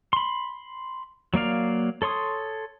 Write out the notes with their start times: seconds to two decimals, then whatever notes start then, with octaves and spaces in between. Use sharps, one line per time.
0.13 B5 C6
1.34 F#3 A#3 D5 F5
2.02 A4 C#5 C6 D#6